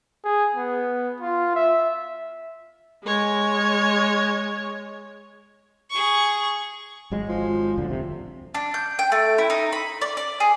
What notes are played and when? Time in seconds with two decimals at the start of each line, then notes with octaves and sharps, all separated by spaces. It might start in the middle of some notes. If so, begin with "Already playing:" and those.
0.24 G#4
0.55 B3
1.20 F4
1.55 E5
3.04 G#3 C#5
5.90 G#4 C#6
7.12 G#1 F#3 G#3
7.28 F3
7.78 D#1 D2 D3
7.90 F2 C3
8.54 D4
8.74 G6
8.99 G5
9.12 A3
9.38 E4
9.50 D#4
9.73 B5
10.01 D5
10.17 D5
10.40 G#4